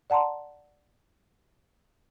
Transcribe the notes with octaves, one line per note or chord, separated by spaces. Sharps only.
D5 F#5 A5 A#5 C6